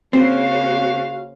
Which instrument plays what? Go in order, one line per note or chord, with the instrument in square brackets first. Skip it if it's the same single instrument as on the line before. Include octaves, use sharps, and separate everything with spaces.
[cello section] C#3 A#3 C5 [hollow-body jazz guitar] C4 [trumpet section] C#4 F5 [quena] F#4